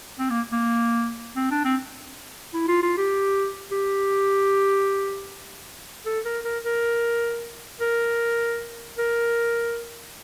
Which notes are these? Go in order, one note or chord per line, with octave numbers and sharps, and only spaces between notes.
C4
A#3
A#3
C4
D4
C4
E4
F4
F4
G4
G4
A4
A#4
A#4
A#4
A#4
A#4